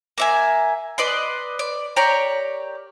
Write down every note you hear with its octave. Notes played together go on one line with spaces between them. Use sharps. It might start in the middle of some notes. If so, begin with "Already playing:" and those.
A#3 E5 G#5
B4 D5 D#5 C6
D5
G4 A#4 C#5 D5